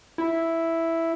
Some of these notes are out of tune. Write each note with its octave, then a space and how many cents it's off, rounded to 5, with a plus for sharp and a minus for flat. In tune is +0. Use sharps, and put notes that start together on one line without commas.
E4 +0